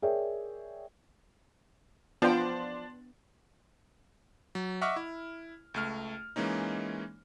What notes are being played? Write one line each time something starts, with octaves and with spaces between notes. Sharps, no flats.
G#4 A#4 C#5 D5 E5 G5
F3 B3 D4 G5 C6
F#3
D#5 E5 F#5 C#6 D6 F6
E4
C#2 A3 F6
E3 G#3 A#3 C#4 D#4